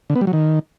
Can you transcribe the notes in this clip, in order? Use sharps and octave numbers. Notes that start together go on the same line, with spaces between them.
D3
B3
G3
F#3
D#3